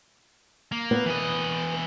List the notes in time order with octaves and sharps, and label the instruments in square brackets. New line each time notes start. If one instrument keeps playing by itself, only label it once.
[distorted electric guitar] A#3
[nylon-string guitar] B3
[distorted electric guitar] E3 D#5